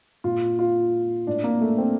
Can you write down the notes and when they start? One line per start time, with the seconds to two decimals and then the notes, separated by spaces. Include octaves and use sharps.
0.24 A#2 F4
0.59 F4
1.27 A2 D4
1.44 A#3
1.61 A3
1.78 C4